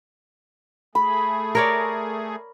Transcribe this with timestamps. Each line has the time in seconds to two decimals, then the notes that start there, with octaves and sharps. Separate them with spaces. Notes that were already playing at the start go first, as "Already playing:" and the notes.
0.95 A3 G#4 B5
1.55 A#4 C#5 D5